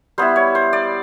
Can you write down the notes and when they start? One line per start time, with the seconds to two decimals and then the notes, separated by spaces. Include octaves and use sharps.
0.18 G3 B3 E4 C5
0.36 C#5
0.55 C5
0.73 D5